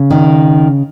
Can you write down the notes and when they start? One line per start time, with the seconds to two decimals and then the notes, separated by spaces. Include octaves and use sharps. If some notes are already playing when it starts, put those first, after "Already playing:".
Already playing: C#3
0.10 D#3